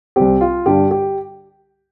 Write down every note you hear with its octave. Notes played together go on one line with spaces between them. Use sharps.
C2 C3 G3 C4 G4
F4
G2 D3 G3 D4 G4
G4